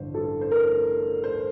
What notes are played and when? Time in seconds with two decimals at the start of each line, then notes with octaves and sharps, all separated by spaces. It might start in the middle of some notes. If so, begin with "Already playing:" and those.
Already playing: A1 G2 D3 C5
0.14 A4
0.41 C5
0.51 A#4
1.24 C5